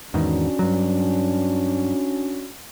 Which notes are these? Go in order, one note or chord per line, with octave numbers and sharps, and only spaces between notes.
E2 G#2 D#3 C#4 D4 F#4
G2 F#3